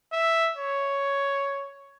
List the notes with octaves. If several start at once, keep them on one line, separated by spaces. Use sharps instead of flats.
E5
C#5